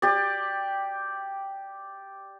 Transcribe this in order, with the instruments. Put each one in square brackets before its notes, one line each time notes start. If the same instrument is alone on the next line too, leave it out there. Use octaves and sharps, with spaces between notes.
[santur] G4 D5